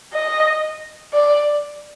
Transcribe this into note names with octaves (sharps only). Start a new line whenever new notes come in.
D#5
D5